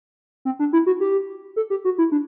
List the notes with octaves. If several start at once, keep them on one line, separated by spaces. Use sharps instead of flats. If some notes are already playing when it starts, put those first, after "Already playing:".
C4
D4
E4
F#4
G4
A4
G4
F#4
E4
D4